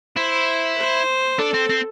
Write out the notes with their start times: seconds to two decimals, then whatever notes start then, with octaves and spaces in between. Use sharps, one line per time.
0.17 E4 C5
0.78 C5
1.39 D4 A4
1.54 C4
1.70 C4